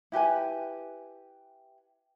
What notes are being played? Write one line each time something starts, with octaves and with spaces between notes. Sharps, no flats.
E4 G4 B4 G#5